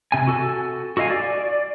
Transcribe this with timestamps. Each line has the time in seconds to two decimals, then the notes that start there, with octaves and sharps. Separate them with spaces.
0.12 C3 G#5
0.27 F#4 A4
0.97 F#4 A4 D#5 F5 G#5
1.10 D5